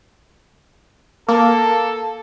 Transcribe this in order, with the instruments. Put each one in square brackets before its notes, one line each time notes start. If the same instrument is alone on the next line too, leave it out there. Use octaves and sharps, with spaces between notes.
[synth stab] A#3 [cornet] A4